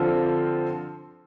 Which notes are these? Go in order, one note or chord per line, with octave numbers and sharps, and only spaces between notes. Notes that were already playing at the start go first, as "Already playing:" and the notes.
Already playing: D3 F3 C4 F4 A4